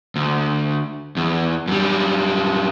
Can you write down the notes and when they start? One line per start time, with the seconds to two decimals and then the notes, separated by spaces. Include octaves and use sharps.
0.16 D2
1.17 E2
1.68 F#2 G3